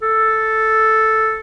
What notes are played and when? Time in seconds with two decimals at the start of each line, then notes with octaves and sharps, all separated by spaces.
0.02 A4